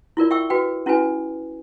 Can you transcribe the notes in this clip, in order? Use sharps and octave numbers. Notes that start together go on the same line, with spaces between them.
E4 F4 A#4 D5
E5 G5 C#6 E6
F#4 B4 G5
C#4 E4 F#4 B4 G#5